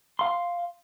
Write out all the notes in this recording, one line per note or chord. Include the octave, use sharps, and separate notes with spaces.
F5 C6